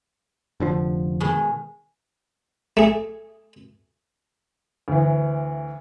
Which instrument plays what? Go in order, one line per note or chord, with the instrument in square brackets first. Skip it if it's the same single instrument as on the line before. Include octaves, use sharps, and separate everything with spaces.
[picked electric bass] F1 D3 F3
[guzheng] B2 D#3 G#3
[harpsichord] A3 G#4
[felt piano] D2 E3